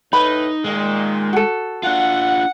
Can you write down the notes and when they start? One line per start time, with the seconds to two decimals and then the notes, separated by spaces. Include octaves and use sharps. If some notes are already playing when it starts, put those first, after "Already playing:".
0.13 A2 D#4 B4 B5
0.64 A#2 D#3 G#3
1.33 F#4 A4
1.83 D4 F4 F#5